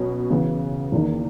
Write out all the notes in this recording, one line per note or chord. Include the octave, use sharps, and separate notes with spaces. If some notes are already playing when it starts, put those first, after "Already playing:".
Already playing: B2 F#3 C#4
C#3 E3 B3
E2 D#3 A#3 D#4